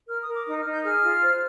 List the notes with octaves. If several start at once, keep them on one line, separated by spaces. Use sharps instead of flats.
A#4 F6
D#6
A#4
D6
D#4 D#6
F6
D#4
G6
G#4 F6
F4
C5